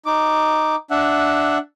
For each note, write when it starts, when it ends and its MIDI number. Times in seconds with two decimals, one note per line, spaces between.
0.06 0.76 63
0.06 0.76 86
0.91 1.58 62
0.91 1.58 76
0.91 1.58 78